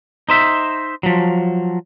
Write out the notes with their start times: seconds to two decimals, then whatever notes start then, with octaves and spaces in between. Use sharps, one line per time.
0.29 D#4 C5 E5
1.03 F3 F#3